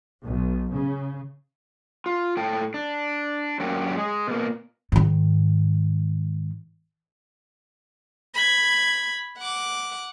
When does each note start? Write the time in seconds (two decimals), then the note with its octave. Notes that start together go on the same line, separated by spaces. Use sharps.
0.25 B1
0.74 C#3
2.06 F4
2.37 A2 A4 G5
2.74 D4
3.60 F#2 A#3 D4 F#4 G4
3.96 G#3 G#4
4.27 B2 A#3
4.92 G#2 D#3
8.35 B5 G#6
9.38 F#5 D6